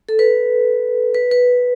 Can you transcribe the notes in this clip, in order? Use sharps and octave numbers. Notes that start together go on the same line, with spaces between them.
A4
B4
B4
B4